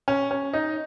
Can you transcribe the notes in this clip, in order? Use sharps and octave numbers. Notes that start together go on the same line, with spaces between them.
C#4
C#4
D#4